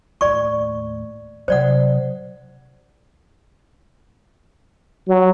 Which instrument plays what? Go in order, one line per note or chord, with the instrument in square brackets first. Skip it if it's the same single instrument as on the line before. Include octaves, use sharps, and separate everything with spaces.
[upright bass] D#2 A2 [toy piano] D5 C#6
[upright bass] C3 F#3 [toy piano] C5 D5 F#5
[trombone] F#3